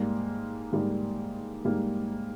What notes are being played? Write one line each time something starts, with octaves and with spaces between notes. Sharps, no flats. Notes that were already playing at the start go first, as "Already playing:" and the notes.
Already playing: G#2 G3 A#3
G#2 G3 A#3
G#2 G3 A#3